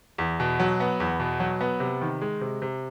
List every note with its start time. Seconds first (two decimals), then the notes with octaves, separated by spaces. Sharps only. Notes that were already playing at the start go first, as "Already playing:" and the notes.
0.18 E2
0.40 B2
0.60 F#3
0.80 B3
1.00 E2
1.20 B2
1.40 F#3
1.61 B3
1.80 C3
2.01 D#3
2.22 G#3
2.41 C3
2.62 C3